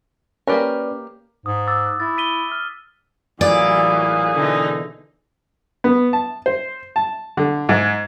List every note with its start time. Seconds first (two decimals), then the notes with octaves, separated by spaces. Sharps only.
0.47 A#3 C#4 G4 A#4 B4 D5
1.46 G#2 D#6
1.67 D6 E6 A6
1.86 F#6
2.00 E4 A6
2.18 B6 D#7 G7
2.52 F6
3.41 A1 A#2 E3 F#3 G#4 D5 F5
4.35 B2 D3 E3 D#4
5.84 B3
6.13 A5
6.46 C5
6.96 A5
7.37 D3
7.69 G#2